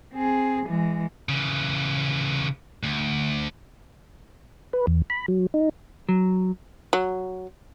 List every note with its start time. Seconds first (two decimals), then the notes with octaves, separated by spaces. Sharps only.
0.13 C4 G#4
0.66 E3 G#3
1.29 C#3 E3
2.83 D2
4.73 B4
4.87 E2
5.10 B5
5.28 F#3
5.54 D#4
6.09 F#3
6.93 F#3